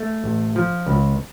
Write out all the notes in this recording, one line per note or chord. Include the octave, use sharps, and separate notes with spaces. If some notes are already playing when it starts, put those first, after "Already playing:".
Already playing: A3
A1
F3
C#2